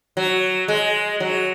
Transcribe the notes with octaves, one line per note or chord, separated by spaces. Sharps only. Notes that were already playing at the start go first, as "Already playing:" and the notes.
F#3
G#3
F#3